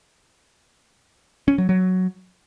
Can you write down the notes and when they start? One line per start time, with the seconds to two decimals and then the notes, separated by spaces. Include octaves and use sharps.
1.48 C#4
1.58 F#3
1.69 F#3